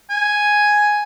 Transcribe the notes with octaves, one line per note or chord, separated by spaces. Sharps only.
G#5